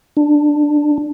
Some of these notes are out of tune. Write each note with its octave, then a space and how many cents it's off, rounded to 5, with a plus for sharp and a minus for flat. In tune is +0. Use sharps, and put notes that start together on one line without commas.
D4 +10